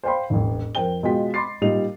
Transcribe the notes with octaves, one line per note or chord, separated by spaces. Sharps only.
C5 D5 F5 G5 B5 C6
E1 A1
F2 A#4 C5 G5 G7
B2 G#3 F4 G5 B6
B5 C6 D6 A6 C7
A#2 G3 D#4 F7